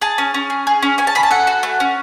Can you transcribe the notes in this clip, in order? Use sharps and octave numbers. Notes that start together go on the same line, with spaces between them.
G#4 A5
C#4
C#4
G#4
G#4
C#4
C#4 G#5
A5
G#4 B5
A5
A4 F#5
F#4
A3
C#4